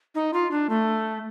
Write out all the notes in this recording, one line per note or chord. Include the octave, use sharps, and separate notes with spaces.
D#4
F4
D4
A3